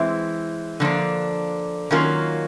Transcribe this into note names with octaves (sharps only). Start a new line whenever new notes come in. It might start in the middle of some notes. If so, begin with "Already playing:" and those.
Already playing: E3 G#3 C4 E4
D3 F3 A#3 D4
D#3 F#3 A#3 C#4 F4